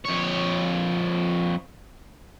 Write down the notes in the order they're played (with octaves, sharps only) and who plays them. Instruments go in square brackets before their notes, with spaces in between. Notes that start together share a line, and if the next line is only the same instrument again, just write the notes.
[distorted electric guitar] F2 C#5